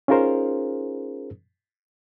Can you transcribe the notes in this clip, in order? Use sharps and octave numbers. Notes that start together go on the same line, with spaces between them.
C#4 D#4 F4 G#4 A#4 C5